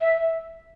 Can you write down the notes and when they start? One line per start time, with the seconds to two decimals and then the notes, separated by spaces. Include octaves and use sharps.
0.01 E5